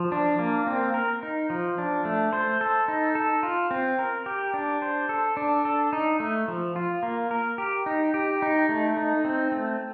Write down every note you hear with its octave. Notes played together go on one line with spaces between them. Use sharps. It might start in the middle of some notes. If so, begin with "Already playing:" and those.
Already playing: F3
D4
A#3
C4
A#4
D#4
F3
D4
A3
C5
A4
D#4
A4
F4
C4
A#4
G4
D4
C5
A4
D4
A4
D#4
A3
F3
F4
A#3
A#4
G4
D#4
G4
D#4
A3
D#4
C4
A3